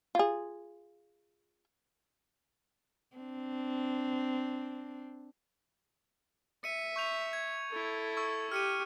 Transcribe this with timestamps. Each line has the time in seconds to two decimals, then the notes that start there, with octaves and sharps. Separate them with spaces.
0.15 F4 G#4
3.16 C4 D4
6.64 E5 C#7 D#7
6.96 C#6 G6 F7
7.33 G#6
7.71 E4 A4
8.17 C#6 E6
8.52 G4 F6 C#7 D#7